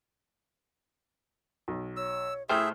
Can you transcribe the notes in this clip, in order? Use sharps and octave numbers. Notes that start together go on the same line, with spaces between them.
B1
C#5 E6
A2 A3 E4 G#4 C5 E5 G5 F6